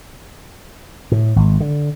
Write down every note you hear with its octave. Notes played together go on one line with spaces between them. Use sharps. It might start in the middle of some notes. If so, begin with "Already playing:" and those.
A2
G#1
D3